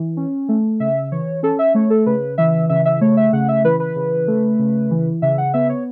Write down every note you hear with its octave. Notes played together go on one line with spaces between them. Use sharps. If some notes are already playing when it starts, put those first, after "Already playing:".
Already playing: E3
C#4
A3
C#3 E5
E3 C#5
C#4 A4
E5
A3 C#5
A4
C#3 B4
E3 E5
C#3 E5
E5
A3 C#5
E5
C#3 F#5
E5
E3 B4
B4
C#3
A3
C#3
E3
C#3 E5
F#5
B3 E5
C#5